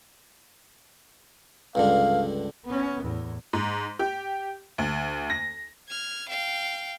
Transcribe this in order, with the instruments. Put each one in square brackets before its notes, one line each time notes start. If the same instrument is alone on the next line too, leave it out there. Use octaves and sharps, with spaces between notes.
[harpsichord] C#2 G2 D3 [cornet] F5
[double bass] B3 C#4
E2 A2
[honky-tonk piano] G#2
G4
D2
A#6
[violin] F6 G#6
F5 G5